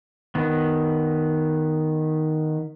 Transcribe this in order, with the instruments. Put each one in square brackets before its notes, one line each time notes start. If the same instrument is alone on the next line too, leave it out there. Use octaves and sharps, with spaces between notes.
[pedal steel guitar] D#3 B3